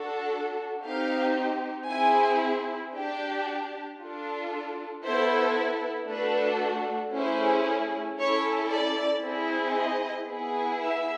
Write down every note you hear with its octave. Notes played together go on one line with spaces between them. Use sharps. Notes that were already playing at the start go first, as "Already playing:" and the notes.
Already playing: D4 F#4 A4
C4 D#4 G4 F5
C4 E4 G#4 G#5
D4 G4 G5
D4 F4 A4
B3 E4 A4 C5
A3 D4 F#4 A4 B4
A3 C#4 E4 G#4 C5
C#4 E4 A4 C#5
D5
C4 E4 G#4
D#5
B3 E4 G#4
E5